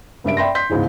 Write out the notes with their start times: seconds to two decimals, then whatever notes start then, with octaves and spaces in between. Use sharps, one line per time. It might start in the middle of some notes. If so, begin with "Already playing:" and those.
0.24 F#1 G2 E5 D7
0.37 D5 E5 G5 B5 C6 A#6
0.55 C6 G6 B6
0.70 G1 C#2 G#2 C#3 E3